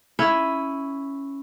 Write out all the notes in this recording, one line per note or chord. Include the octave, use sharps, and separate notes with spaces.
C#4 E4